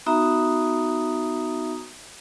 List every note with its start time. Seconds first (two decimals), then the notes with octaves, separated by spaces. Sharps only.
0.06 B3 D#4 F#4 E5 A#5 D#6